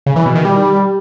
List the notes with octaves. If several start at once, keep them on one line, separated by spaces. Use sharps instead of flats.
C#3
E3
B2
D#3
G3